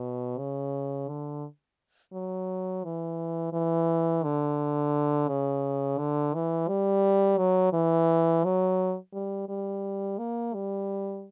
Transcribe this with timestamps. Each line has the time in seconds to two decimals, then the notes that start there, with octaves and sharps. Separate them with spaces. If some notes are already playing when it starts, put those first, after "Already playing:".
Already playing: B2
0.38 C#3
1.09 D3
2.13 F#3
2.84 E3
3.53 E3
4.24 D3
5.28 C#3
5.99 D3
6.34 E3
6.68 G3
7.38 F#3
7.73 E3
8.44 F#3
9.13 G3
9.49 G3
10.18 A#3
10.54 G3